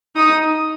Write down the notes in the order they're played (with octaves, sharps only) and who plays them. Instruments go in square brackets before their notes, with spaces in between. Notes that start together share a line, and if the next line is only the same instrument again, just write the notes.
[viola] D#4 [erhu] D#6